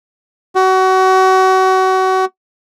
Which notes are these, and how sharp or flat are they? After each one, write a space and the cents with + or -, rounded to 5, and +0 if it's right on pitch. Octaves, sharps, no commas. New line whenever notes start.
F#4 +30